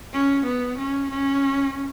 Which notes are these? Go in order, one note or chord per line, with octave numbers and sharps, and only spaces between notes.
C#4
B3
C#4
C#4